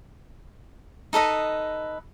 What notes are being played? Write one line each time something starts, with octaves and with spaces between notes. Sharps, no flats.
D#4 A4 B4 D#5